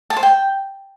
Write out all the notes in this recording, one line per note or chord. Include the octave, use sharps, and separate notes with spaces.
A5
C5
G5